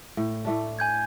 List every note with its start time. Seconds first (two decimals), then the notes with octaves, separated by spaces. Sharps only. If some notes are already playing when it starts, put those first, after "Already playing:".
0.17 A2
0.45 A2 A3 D4
0.79 G#5 G6 G#6